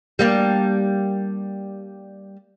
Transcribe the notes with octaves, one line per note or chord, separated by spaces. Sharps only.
G3 A#3 D4